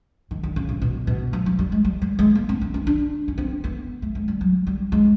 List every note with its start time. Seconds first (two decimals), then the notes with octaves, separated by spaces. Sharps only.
0.31 D#3
0.43 D3
0.56 C#3
0.69 C3
0.82 B2
1.07 B2
1.33 F3
1.46 F3
1.59 G3
1.72 G#3
1.85 G3
2.02 G3
2.19 G#3
2.35 A#3
2.49 C4
2.61 C4
2.74 C#4
2.87 D4
3.28 C#4
3.38 C4
3.64 B3
4.02 A3
4.15 G#3
4.28 G3
4.41 F#3
4.67 G3
4.92 G#3